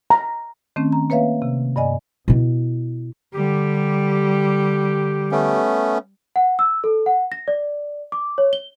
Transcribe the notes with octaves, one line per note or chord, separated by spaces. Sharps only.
A#5
D#3 A3 C4 C#4
A#5
A#3 B4 C#5 E5 F5
C3
G2 D5 D#5 G#5
B2 E4
D3 G3 G4
A3 B3 C#4
F#5
E6
A4
F#5
A#6
D5
D6
C#5
G7